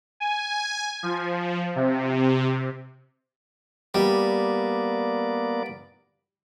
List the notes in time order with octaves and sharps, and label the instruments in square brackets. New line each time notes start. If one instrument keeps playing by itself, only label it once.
[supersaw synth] G#5
F3
C3
[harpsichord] G3 [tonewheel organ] A#3 B3 D5